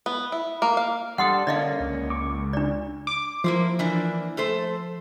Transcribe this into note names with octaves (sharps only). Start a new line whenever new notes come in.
B3
E4
A#3
F5
G3 D4 A4 F#5 C6 D#6
D3 A#3 C#4 D5 D#5 F5
C#2
C#6 D6
D4 D5
D6
F3 A#3 E4 C5
E3 A#3 D4
A3 A4 C5